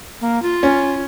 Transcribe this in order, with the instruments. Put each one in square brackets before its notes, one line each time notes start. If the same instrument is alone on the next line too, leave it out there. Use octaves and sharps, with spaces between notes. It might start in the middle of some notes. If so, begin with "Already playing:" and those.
[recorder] A#3
F4
[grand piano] C#4